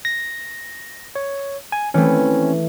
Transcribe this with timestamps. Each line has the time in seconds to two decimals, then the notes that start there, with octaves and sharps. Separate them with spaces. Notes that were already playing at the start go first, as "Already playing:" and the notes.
0.05 A#6
1.15 C#5
1.72 G#5
1.94 E3 A3 C4 C#4